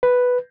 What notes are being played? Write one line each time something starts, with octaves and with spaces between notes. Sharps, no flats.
B4